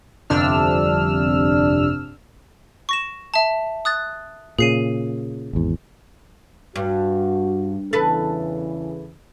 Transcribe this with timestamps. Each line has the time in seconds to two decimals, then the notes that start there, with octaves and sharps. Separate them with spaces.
0.30 G1 F2 C3 D4 E6 F6
2.89 C#6 A#6 E7
3.34 E5 A5
3.85 D#6 F#6 A6
4.59 A#2 C#3 G#4 C7 D#7
5.53 G#1 E2
6.76 G2 F#4
7.93 E2 C#3 E3 A4 B4